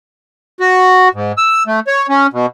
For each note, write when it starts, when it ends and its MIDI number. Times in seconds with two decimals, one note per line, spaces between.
0.60 1.08 66
1.14 1.32 44
1.38 1.63 88
1.67 1.80 57
1.87 2.07 73
2.09 2.27 61
2.33 2.46 47